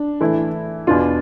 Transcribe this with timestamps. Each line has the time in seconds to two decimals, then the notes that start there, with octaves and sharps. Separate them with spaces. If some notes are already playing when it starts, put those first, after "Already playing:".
Already playing: D4
0.20 E3 A3 E4
0.87 E2 B2 B3 D4 F4